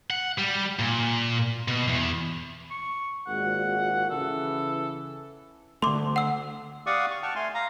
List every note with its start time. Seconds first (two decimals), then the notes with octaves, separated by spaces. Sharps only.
0.10 F#5
0.38 G3
0.79 A#2
1.68 B2
1.88 E2
2.71 C#6
3.27 G#1 A#2 F#4 F#5
4.10 C#3 E3 A4
5.82 D3 A3 C6 D6
6.16 F#5 E6
6.86 G4 D5 F5 F#5 C#6 D#6
7.11 C#6
7.23 F#5 G5 A5 C#6 F6
7.35 A3 G#5 C6
7.54 F5 A#5